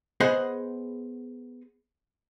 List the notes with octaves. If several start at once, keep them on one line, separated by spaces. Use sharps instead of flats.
B3 G#4 C5 D#5 F#5